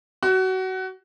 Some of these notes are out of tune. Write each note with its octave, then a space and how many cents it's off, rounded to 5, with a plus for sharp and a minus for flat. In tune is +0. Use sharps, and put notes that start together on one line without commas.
F#4 +25